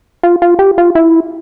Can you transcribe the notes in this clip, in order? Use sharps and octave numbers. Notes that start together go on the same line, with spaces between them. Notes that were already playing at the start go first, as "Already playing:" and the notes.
F4
F4
G4
F4
E4